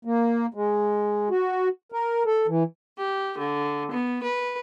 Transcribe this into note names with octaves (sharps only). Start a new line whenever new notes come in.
A#3
G#3
F#4
A#4
A4
E3
G4
D3
B3
B4